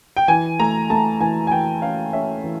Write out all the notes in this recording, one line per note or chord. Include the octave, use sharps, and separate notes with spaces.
G5
E3 G#5
A3 A#5
A3 A5
E3 G#5
G#5
E3 G5
C#4 F5
C#4 E5
E3